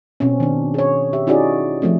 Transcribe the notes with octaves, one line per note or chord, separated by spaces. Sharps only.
B2 C4 C#4
D#3 D4
G#4 C#5
G4 E5
C#4 D#4 E4 F#4 G#4 D5
F3 A3 C4